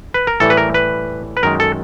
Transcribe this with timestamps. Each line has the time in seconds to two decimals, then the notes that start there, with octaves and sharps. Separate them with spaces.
0.14 B4
0.27 A#4
0.40 A2 E3 G3 A4
0.50 B4
0.57 A#4
0.74 B4
1.37 B4
1.43 F#2 D#3 G#3 A#4
1.60 A4